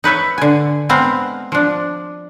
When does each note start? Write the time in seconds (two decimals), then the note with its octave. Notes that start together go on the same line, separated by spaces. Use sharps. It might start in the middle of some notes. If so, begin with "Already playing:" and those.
0.04 D#4 B4 C#5 E5
0.38 D3 G#5
0.89 G#3 B3 C4 F5 A#5
1.52 F3 D4